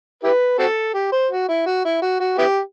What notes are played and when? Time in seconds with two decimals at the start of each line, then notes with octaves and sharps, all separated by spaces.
0.24 E4 G4 B4
0.59 C4 F#4 A4
0.94 G4
1.13 C5
1.31 F#4
1.48 E4
1.66 F#4
1.85 E4
2.02 F#4
2.20 F#4
2.38 B3 E4 G4